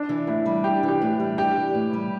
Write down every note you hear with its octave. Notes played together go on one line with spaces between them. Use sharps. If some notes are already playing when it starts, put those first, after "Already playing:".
Already playing: D4
E3
A2 E4
G3
D4 G4
E3
G4
A2
G3
D4 G4
E3
A2
G3